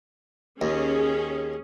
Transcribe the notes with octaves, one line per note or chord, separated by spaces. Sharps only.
D#2 C#4 G#4